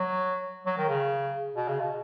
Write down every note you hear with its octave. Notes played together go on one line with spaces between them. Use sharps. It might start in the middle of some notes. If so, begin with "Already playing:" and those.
Already playing: F#3
F#3
D#3
C#3
B2
C#3
B2